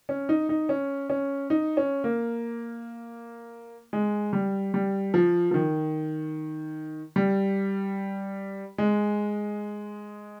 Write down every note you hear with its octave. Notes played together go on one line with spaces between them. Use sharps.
C#4
D#4
D#4
C#4
C#4
D#4
C#4
A#3
G#3
G3
G3
F3
F3
D#3
G3
G#3